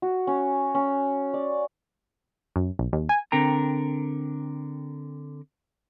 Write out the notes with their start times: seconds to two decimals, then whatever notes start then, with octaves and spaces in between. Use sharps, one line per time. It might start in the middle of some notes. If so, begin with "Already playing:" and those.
0.02 F#4
0.27 C#4
0.75 C#4
1.34 D5
2.56 F#2
2.79 B1
2.93 D#2
3.09 G#5
3.32 D3 C4 A#4 G5 A#5